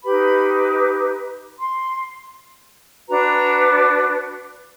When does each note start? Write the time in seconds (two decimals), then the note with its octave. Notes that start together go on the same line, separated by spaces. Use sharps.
0.02 D#4 G4 B4 B5
1.55 C6
3.08 D4 F#4 B4 A#5